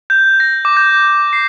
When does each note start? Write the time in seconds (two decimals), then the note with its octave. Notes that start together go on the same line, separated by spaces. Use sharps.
0.10 G6
0.40 A#6
0.65 D6
0.77 G6
1.33 C7